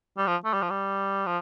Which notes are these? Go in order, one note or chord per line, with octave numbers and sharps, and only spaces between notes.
G3
F3
A3
G3
F3
G3
F3